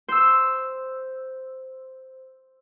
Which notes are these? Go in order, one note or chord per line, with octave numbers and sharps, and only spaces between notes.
C5 E6